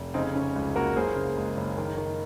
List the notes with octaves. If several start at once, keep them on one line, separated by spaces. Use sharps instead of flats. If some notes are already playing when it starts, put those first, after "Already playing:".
Already playing: F1
C#3 C4 D#4
C#3 C#4
C#2
A#3 F#4 A#4
F#1 G#4 C5
C#3
G#3
F#1
D#3
D#3